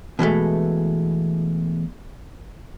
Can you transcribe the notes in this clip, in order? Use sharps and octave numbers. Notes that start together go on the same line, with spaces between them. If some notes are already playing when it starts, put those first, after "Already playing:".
B2 E3 G#3 A3